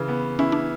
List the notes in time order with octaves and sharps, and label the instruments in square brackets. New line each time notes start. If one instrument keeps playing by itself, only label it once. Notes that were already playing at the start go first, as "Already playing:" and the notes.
Already playing: [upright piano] C#3 E3 [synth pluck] B4
[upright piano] B3
[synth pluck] C#4 [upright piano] E4
[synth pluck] D4